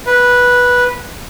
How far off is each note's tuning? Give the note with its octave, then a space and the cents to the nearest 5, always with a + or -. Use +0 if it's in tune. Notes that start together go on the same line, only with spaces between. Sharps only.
B4 -10